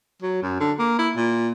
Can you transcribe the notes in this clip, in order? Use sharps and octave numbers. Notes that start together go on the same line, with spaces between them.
F#3
F#2
D3
A#3
E4
A#2